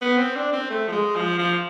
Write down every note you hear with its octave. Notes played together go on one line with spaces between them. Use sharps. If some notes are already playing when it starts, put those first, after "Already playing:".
B3
C4
D4
C4
A3
F3
G#3
F3
F3